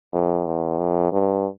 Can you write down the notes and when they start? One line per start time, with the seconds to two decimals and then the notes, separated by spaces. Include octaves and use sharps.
0.13 F2
0.46 E2
0.78 F2
1.12 G2